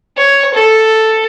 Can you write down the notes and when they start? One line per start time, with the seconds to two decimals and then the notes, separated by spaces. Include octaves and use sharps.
0.17 C#5
0.54 A4